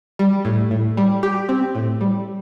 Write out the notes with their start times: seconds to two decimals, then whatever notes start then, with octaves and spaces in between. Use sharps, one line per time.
0.19 G3
0.45 A2
0.71 A2
0.97 G3
1.23 G4
1.49 C4
1.75 A2
2.01 G3